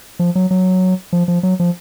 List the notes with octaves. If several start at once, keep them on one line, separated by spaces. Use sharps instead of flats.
F3
F#3
F#3
F3
F3
F#3
F3